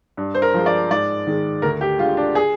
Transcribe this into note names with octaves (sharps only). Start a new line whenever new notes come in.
G2
C5
A#4
F3 G#3
D5
G#2 D5
D#3 G#3
D2 A#4
G4
D3 G#3 F4
D4
G#4